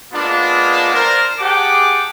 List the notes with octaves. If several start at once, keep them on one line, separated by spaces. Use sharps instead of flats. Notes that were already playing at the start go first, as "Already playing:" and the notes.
G#3 A#3 B3 D4 F4
A#4 C5 D5
G4 G#4 F#5 G5 A5 D6